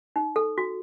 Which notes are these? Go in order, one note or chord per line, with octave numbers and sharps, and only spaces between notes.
D#4
A4
F#4